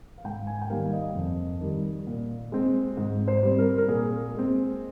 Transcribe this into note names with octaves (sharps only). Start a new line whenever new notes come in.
F5
G#2 G5
G#5
G5
D#3 G3 A#3 F5
D#5
F2
D#3 G3
A#2
G#3 C4
G#2
C5
G3 C4
A#4
A#4
A#2 G#4
G#3 C4